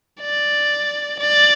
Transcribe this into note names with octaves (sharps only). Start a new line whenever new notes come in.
D5
D5